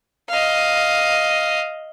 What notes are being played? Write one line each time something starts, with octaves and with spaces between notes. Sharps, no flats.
D#5 F5